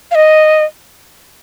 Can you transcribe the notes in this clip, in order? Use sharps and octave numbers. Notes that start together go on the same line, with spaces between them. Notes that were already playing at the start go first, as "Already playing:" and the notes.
F5
D#5